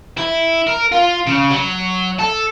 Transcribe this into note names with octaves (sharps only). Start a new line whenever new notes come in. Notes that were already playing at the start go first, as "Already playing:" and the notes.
E4
A#4
F4
C#3
F#3
A4